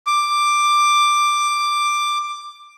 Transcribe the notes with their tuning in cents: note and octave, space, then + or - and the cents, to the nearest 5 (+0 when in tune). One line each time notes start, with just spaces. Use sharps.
D6 +10